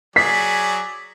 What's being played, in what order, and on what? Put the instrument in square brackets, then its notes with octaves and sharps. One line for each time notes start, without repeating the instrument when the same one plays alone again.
[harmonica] F#3 G#4 D5 [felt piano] B6